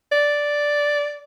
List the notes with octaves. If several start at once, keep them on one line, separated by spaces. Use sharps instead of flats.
D5